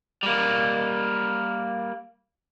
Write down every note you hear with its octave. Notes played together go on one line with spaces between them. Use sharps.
G3 A#3